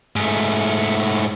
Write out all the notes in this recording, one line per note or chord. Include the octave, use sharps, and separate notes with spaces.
G#2 A3